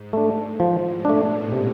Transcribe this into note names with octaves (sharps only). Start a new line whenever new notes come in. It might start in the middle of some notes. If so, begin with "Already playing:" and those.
Already playing: G#2
G#2 A3 D4
A2 F3
B2
A3 D4
A#2
C3